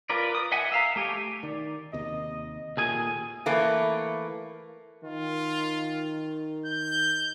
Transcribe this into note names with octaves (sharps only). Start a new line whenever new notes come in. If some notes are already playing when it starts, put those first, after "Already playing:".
F4 A#4 B4 D5
D#6
D#5 E5 F#5 G#5
E5 F5 A#5
A3 G4 G#5
D#3 D5
D#2 C3 D#5
D#2 A#2 A3 G#4 G#5
E3 A3 A#3
D#3 F4
G6